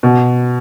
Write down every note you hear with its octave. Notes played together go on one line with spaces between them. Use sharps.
B2